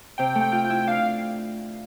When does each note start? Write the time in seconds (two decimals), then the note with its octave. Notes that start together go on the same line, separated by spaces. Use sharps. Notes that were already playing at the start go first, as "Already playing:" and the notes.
0.18 C3 G5
0.35 A3
0.41 G5
0.52 F4
0.65 G5
0.70 E4
0.87 D4 F5